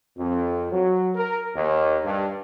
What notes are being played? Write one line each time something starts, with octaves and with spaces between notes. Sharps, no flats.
F2
F#3
A#4
D#2
G2